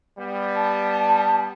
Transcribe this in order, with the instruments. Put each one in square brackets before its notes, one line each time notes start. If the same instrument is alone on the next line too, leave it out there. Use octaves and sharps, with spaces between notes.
[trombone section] G3 B3
[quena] A5